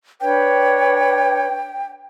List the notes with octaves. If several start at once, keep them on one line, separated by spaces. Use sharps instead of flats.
D4 B4 C#5 G5